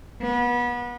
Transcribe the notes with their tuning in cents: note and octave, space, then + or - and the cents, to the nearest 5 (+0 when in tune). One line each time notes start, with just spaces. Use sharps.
B3 -30